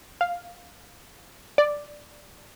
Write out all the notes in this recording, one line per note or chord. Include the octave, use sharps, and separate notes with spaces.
F5
D5